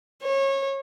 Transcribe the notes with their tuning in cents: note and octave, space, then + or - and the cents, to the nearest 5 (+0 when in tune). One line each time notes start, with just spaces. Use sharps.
C#5 -25